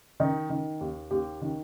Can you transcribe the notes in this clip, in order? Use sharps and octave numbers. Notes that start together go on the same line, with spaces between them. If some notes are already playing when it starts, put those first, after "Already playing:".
D#3 D#4
D#3
D#2
D#2 G4
D#3